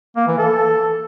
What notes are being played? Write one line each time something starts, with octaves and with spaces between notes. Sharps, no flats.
A#3
E3
A4